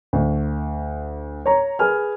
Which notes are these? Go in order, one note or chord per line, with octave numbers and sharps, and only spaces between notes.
D2
C#5 A#5
G#4 B4 G#5 F6